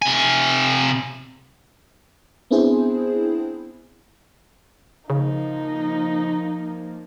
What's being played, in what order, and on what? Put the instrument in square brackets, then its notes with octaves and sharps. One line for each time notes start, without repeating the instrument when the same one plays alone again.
[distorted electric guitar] C3 G#5
[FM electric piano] B3 C4 D4 E4 G#4 C5
[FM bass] C#3 [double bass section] F3 A#3 [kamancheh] D#4